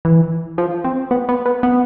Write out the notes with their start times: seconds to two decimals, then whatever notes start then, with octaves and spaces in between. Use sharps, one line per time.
0.05 E3
0.58 F3
0.84 C4
1.11 B3
1.29 B3
1.46 B3
1.63 B3